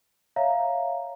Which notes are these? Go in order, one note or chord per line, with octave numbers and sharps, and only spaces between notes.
C#5 E5 F5 A#5